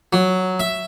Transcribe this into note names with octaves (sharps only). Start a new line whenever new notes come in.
F#3
E5